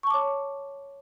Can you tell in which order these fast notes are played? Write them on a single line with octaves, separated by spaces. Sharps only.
C#6 A5 D6 C#5